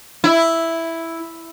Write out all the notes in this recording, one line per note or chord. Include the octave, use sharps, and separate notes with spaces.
E4